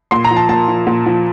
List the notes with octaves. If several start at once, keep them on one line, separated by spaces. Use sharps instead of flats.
A#2 C6
A#5
F3
A5
A#2 A5
F3
A#2
F3